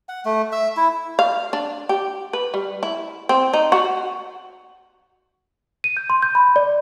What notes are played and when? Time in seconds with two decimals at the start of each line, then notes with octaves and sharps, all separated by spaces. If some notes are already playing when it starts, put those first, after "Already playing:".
0.09 F#5
0.25 A3
0.52 E5
0.77 E4
1.19 F5
1.53 D4
1.89 G4
2.33 B4
2.54 G3
2.83 E4
3.29 C4
3.53 D#4
3.72 F#4
5.84 D#7
5.97 G6
6.10 C6
6.22 G6
6.35 B5
6.56 D5